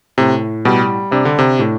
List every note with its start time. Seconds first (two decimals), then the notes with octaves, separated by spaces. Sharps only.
0.18 A2 C3
0.65 B2 G3
1.11 C3 D4
1.25 D3
1.39 C3
1.59 A2